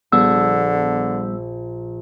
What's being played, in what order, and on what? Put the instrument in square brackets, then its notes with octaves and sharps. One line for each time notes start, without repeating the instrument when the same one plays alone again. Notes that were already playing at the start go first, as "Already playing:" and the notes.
[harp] A#1 [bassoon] D3 [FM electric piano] G3 B3 [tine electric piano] E6